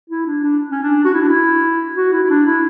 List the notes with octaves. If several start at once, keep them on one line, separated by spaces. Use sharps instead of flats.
E4
D4
D4
C#4
D4
F#4
E4
D4
E4
F#4
E4
E4
D4
E4